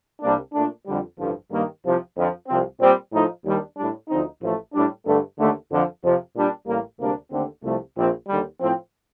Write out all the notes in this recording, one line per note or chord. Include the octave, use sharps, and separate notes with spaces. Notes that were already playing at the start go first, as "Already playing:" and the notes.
C2 C3 G3 A#3 D4
A#2 A3 D4
F2 D3 G3
A1 G2 D3 F3
G2 D#3 G3 A#3
C2 C3 F3
F2 D3 F3
C2 C3 F3 C4
A#2 G3 C4
A2 F3 A3 D#4
D#2 D#3 G3 D4
A2 G3 D4
D2 D3 F3 C4 D#4
A1 A2 F3 A3
A2 G3 D4
G2 D3 A3
D#2 D3 A3
F2 D3 F3
F2 C3 F3
A#2 G3 D4
A1 A2 G3 A#3
D2 C3 G3 A#3 D4
D#2 D3 A3 C4
C2 C3 F3 A3
A#1 A#2 F3 C4
D#2 D3 G3
A2 F3 C4